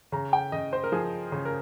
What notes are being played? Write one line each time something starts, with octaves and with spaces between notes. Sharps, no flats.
C#3 A#5
G5
C#3 D#5
C5
A#4
F3 G#4
C#3
A#4